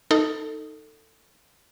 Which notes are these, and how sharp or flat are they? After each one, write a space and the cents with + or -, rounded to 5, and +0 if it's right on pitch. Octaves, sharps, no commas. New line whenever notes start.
D#4 +0 A4 +20